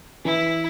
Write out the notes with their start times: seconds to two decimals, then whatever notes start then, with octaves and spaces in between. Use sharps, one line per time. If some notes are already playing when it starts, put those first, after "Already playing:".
0.25 E3 E4